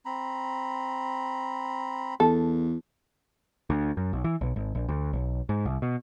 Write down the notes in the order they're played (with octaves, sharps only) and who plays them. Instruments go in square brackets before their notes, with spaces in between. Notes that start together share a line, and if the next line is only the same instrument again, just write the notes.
[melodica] C4 A#5 B5
[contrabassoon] E2 [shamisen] A4
[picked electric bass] D2
F#2
B1
E3
B1
G#1
A#1
D2
B1
G#2
C2
B2